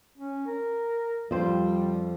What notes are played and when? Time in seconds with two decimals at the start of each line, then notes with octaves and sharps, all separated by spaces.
0.18 C#4
0.47 A#4
1.31 F2 G3 C5